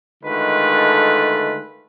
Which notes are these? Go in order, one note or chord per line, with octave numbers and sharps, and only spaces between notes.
D3 D#3 G#3 A3 F4 B4